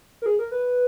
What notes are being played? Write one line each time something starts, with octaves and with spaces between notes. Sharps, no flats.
A#4
G#4
A#4
B4